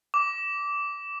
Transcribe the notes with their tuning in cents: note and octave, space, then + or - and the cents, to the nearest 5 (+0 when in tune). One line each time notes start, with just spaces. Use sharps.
D6 -15